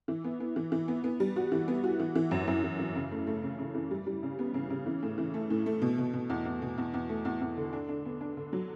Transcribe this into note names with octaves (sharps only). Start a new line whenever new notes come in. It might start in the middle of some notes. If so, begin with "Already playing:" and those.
E3
B3
B3
E3
E3
B3
B3
G3
F#4
E3
B3
F#4
E3
E3
F#2
F#2
E3
E3
C#3
A3
A3
C#3
C#3
E3
G3
G3
C#3
B3
C#3
C#3
E3
A2
E3
A3
A2
A3
B2
B2
B2
E2
E2
B2
E2
E2
A3
E2
E2
D3
D4
D4
B3
D4
D3
F#3